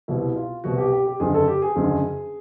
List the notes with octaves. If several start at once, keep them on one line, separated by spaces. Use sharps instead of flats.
C2 B2 E4
F4
C2 B2 F#4
G4
G4
G4
F#1 F#2 D3 G#4
A4
G4
G#4
F#1 F#2 D3